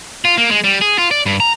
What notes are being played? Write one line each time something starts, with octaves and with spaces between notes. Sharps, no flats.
F4
A#3
G#3
G3
G#4
F4
D5
G2
A#5